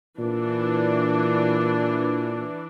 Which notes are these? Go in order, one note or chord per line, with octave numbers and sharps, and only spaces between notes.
A#2 E3 D4